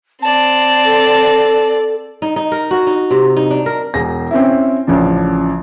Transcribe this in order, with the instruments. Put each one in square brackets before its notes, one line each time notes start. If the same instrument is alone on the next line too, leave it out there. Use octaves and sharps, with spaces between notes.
[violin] C4 D5 [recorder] A5
[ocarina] A4
[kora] D#4
D#4
A#4
F#4
D#4
C3
D#4
D4
A#4
[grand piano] E1 G#4 A#6
C4 C#4 E4
A1 C#3 F3 D4